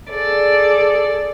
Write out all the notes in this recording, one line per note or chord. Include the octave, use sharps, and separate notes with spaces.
G#4 A4 D5